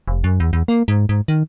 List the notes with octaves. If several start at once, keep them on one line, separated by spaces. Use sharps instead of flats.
F1
F#2
E2
E2
A#3
G#2
G#2
D#3